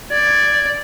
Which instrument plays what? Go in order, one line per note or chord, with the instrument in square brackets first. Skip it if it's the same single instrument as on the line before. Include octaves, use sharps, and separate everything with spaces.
[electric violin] D5 [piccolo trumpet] G#6